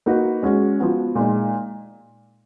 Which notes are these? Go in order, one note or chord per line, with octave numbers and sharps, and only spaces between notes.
A#3 D#4 F#4 B4
G#3 C#4 F#4
F3 B3 F#4
A#2 G#3 D#4